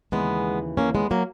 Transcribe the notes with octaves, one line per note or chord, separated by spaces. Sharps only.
D#2 C#3 E3 G#3 B3
A#3 C#4
G#3 B3
F#3 A#3